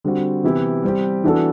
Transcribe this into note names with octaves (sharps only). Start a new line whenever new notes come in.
D3 G3 C4 F#4
C3 E3 B3 E4 G4
G3 C4 G4
E3 B3 D4 F#4 A4